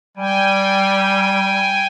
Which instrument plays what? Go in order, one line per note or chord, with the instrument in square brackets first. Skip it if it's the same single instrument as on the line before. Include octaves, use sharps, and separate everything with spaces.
[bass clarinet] G3 [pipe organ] G5 G#5